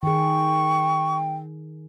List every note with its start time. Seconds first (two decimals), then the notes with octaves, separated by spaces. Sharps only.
0.03 D#3 G#4 G5 C#6